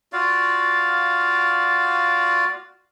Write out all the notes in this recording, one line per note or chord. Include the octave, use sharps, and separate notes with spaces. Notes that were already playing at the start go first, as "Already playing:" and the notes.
F4 F#4 D5 F5